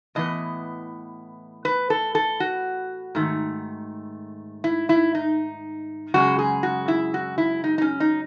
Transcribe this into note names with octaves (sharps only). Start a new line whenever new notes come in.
A2 E3 B3 D#5
B4
A4
A4
F#4
G#2 D#3 A3
E4
E4
D#4
F#2 C#3 G#3 F#4
G#4
F#4
E4
F#4
E4
D#4
D#4
C#4
D#4